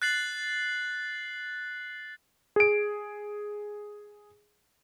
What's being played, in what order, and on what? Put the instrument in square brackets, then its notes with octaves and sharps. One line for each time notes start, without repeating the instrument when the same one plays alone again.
[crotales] F#6 A6 C7 F#7
[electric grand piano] G#4 D7